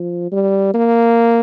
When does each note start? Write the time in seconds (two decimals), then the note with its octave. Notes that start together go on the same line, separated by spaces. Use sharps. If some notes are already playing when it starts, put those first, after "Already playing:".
Already playing: F3
0.32 G3
0.74 A#3